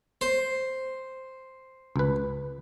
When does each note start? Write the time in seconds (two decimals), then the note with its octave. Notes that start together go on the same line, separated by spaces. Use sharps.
0.21 C5
1.96 C#2 B4